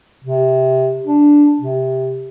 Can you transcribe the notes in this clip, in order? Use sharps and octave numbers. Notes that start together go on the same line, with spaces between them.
C3
D4
C3